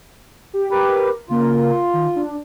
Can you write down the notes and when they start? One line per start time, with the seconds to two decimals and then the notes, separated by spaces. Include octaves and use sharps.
0.54 G4
0.71 G4 A#4 B4
1.29 C#3 A#3 F4 A#4
1.93 D#3
2.16 D4